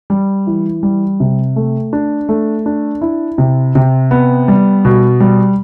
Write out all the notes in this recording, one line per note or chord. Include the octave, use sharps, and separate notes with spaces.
G3
E3
G3
C3
A3
D4
A3
D4
E4
C3
C3
B3
G3
B2
G3